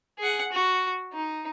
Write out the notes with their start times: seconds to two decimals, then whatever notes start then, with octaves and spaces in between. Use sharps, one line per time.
0.19 G#4 F#5
0.52 F#4
1.13 D#4